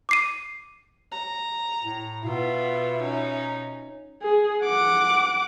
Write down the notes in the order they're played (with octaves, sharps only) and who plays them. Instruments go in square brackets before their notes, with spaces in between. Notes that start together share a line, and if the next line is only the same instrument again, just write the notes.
[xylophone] D6 C7 D#7
[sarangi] A#5
[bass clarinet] A2
[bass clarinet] B2 [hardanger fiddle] B3 F4 [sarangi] E5
[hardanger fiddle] C#4 D#4
[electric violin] G#4
F#5 D6